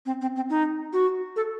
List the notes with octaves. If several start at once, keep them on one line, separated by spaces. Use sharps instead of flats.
C4
C4
C4
D#4
F#4
A4